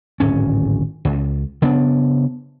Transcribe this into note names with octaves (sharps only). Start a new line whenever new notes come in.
D1 G#1 C#4
C#2
C#3 B3 D4